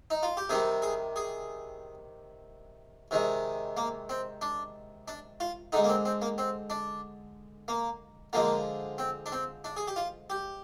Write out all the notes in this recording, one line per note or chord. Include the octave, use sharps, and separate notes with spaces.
D#4
F4
G4
C3 D#3 G3 G#4
G#4
G#4
C3 D#3 G#3
A#3
C4
D4
D4
F4
D3 G#3 D#4
A#3
C4
C4
A#3
C4
D4
A#3
D3 F3 G#3 A#3
C4
D4
C4
D4
G#4
G4
F4
G4